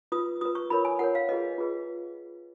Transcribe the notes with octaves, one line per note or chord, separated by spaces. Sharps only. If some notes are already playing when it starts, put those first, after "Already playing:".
F4 B4 D#6
F4 B4 D#6
C#6
F4 A#4 C#5 B5
G#5
F4 A#4 C#5 F#5
F5
F4 G#4 B4 D#5
F4 G#4 B4